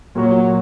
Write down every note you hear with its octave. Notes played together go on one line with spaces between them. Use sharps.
A#2 F#3 A#3 F#4 C#5